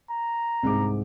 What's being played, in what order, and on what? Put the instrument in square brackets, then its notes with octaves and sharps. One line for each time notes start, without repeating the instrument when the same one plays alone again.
[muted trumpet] A#5
[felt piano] C2 G#2 D6